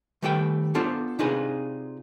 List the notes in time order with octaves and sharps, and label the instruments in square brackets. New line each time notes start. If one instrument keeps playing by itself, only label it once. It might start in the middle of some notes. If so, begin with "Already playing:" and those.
[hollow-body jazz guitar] D#3 G3 A3 B4 C#5 G5
B3 D4 F4 A4 C5
C3 D4 D#4 F4 G#4 B4